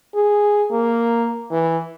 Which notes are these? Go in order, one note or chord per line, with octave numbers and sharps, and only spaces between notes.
G#4
A#3
E3